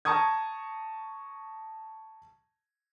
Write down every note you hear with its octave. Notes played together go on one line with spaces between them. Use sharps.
A5 A#5 C#6 D#6 G#6